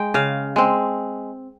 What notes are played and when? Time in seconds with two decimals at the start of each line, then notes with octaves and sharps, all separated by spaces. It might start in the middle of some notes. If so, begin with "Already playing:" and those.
Already playing: G#3 G5
0.14 C#3 F5
0.56 G#3 C4